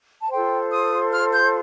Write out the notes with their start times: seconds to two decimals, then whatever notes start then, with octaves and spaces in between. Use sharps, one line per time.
0.20 A5
0.30 F4 A4 C5 G5
0.71 D#6
1.11 F6
1.32 G6